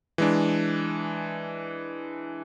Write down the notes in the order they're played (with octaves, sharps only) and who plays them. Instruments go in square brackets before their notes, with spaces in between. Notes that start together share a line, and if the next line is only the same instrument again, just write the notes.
[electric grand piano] E3 G#3 D4